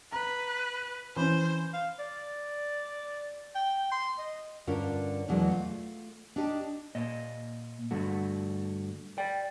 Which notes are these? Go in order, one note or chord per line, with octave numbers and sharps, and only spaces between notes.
B4 A#5
E3 C#4 C5
F5
D5
G5
C6
D#5
G2 D3 C#4 F4 A#4
E2 B2 E3 F#3 G#3
A3 F4
D4 D#4 G4 D#5
A#2 D#5
G2 D3 A3 F#4
D5 G5